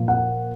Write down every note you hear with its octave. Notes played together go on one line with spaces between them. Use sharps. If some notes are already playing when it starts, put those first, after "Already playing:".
Already playing: A#2 F3
F#5